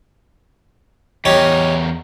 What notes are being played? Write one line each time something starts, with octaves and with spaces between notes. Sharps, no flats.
E2 D#4 G4 A#4 C#5